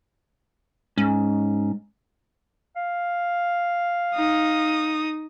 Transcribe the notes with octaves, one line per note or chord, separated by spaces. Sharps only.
G#2 C#4
F5
D#4 D#6